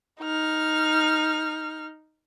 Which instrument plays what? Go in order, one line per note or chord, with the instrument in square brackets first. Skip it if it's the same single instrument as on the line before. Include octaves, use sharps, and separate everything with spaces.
[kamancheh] D#4 F6